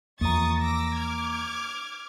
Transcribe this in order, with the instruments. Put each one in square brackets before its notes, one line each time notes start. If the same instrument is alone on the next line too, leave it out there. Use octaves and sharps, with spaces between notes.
[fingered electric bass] E2 F3 [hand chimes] A#3 A#5 [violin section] C#6 D#6 A6
[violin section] D6 E6 A#6
D6 F6 G#6